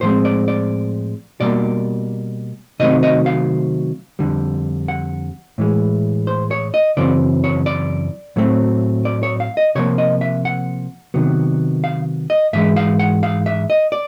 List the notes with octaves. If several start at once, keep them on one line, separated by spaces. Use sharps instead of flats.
A2 F3 G#3 C4 C5
D5
D5
B2 G3 A#3 D5
C3 D#3 F#3 A3 C4 D#5
D#5
F5
F2 D3 G3
F#5
A2 E3 G#3
C5
C#5
D#5
F#2 C#3 E3 C4 D5
C#5
D5
A2 F#3 A3 C4
D5
C#5
F5
D#5
C3 F3 A#3 C#5
D#5
E5
F#5
C3 D#3 F#3 B3
F5
D#5
G#2 E3 G#3 E5
F5
F#5
F5
E5
D#5
D5